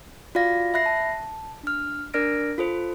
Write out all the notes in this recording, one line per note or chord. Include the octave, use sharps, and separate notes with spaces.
F4 F#4 D5 F5 A#6
E5 B5 F#6 A#6 C7
A5
D4 F6
D4 A#4 D5 F6 A#6 D7
F4 A4 C5